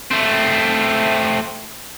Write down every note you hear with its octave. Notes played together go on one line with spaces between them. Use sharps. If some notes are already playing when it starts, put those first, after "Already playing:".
A3 C4